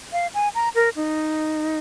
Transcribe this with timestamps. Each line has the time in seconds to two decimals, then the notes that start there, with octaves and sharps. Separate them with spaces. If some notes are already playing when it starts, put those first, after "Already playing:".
0.13 F5
0.34 G#5
0.55 A#5
0.75 A#4
0.96 D#4